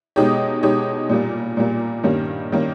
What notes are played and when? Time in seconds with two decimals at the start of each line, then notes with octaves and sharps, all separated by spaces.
0.16 B2 G#3 D#4 G4 C#5
0.63 B2 G#3 D#4 G4 C#5
1.09 A#2 G3 A#3
1.57 A#2 G3 A#3
2.03 G2 D#3 G3 A#3 C#4
2.52 D#3 G3 A#3 C#4